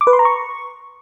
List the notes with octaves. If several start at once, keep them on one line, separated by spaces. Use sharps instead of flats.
D6
B4
C6
A#5
C#6